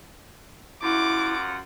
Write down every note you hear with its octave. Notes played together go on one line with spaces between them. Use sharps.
F#2 E4 F4 F#5 D6